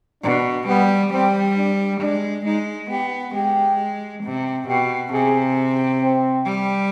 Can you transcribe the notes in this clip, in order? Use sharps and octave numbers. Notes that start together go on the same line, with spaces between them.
B2 D4
G3 B3
G3 C4
D4
G#3 D4
G#3 D#4
B3 G4
G#3 G4
C3
B2 G4
C3 G#4
C4
G3